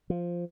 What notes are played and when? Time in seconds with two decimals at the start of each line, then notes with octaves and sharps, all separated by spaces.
0.10 F3